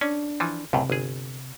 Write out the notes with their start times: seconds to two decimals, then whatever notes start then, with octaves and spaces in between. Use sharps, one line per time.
0.01 C#4 D4
0.40 E3 F3
0.73 C#2 F#2 A2 C3
0.90 G1 G#4